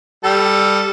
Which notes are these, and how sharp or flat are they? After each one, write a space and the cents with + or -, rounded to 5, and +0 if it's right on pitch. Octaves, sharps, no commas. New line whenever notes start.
G3 +15 A4 +0